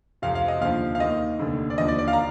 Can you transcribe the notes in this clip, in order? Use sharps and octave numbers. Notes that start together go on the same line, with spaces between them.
F1 F2 C3 F5
F5
D#5
D#2 D3 F3 F5
F5
D#2 D#3 D#5
F1 D#2 D3
D5
D#2 D3 F3 D#5
D5
D5
F5
A#5